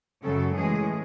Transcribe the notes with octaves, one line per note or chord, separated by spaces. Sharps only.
F#2 C#3 F#3 A4
A2 E3 G#3 G#4